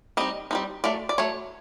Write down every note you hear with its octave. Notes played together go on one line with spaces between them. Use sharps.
G3 C4 D#4 D#5
G3 C4 D#4
F#3 A3 D5
D5
F#3 A3 C#5